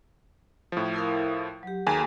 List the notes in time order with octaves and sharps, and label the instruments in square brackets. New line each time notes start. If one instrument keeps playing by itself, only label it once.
[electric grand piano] A2 F3
[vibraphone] E4 A#4 F5
F#3 G4
[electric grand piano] D#2 G#4 G#5 [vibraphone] A#3 F#4 A4